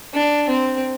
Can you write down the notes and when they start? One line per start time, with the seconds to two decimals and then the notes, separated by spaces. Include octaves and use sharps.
0.14 D4
0.49 C4